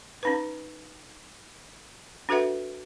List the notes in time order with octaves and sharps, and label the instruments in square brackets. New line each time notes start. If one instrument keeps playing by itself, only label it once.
[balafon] C#4 D#4 B4
D4 F#4 A4 B4 E5 F#5